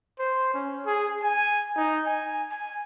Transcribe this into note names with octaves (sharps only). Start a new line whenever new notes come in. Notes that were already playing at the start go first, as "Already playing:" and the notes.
C5
C#4
G#4
G#5
D#4
G#5
G#5